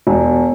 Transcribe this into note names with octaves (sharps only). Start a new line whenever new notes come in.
E1